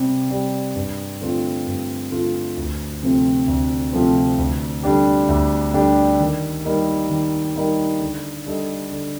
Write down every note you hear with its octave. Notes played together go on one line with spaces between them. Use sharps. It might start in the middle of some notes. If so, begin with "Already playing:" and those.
Already playing: C3 G3 C4 G4
G3 C4 G4 D5
G2
D3 A3 C4 F4
G2
D3 A3 C4 F4
D2
C3 F3 A3 C4
D2
C3 F3 A3 C4
D2
D3 G3 D4 G4
D2
D3 G3 D4 G4
D#3
G3 A#3 D#4 A#4
D#3
G3 A#3 D#4 A#4
D3
G3 D4 A4 D#5
D3